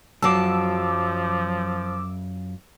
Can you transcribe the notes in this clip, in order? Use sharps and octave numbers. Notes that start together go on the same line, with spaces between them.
F#2 F3 F#3 F4 A5 D6 E6